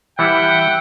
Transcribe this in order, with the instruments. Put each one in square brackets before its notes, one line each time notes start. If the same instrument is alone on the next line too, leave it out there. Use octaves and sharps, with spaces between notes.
[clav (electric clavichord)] E3 G3 E4 [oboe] E5 [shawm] F#5 [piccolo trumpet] G5